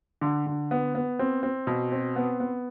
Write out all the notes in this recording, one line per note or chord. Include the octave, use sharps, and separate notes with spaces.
D3
D3
B3
B3
C4
C4
B2
C4
B3
B3